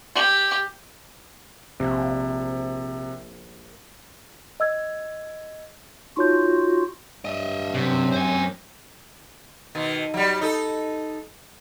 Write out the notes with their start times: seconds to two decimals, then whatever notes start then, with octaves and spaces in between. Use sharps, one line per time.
0.16 G4
1.80 A#1 C3
4.60 D#5 E6 G#6
6.17 D#4 F4 F#4 C#5 G6
7.25 G2 D#5 E5
7.74 F#2 C3 C4
8.13 C5 G#5
9.75 B2 D#3
10.14 F#3 G3
10.41 D#4 A4